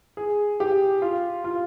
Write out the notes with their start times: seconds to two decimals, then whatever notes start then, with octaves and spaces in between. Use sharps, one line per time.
0.17 G#4
0.60 G4
1.02 F4
1.44 F4